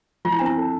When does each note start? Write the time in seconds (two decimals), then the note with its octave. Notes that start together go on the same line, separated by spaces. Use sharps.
0.25 F3 F4
0.32 E4
0.39 C4 D4
0.46 E4
0.57 A4